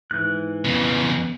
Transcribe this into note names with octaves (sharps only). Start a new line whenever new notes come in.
G#2 E3 F#6
F2 C#3 B3